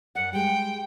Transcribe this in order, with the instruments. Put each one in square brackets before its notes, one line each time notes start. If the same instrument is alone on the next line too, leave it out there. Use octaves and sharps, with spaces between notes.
[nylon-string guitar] F#2 D5 [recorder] F#5
[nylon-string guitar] G3 G#3 [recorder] G5